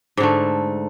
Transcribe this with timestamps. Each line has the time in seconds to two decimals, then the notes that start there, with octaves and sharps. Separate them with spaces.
0.17 G#2
0.20 D3
0.23 A3